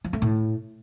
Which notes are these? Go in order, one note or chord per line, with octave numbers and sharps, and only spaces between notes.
F3
A3
A2